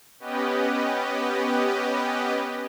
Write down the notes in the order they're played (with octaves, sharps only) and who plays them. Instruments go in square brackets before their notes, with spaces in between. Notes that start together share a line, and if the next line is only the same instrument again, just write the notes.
[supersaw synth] B3 C#4 G4 B4 D#5